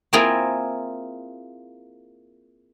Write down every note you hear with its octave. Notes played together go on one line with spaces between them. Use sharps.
A#3 C4 E4 F4 G#4 A#4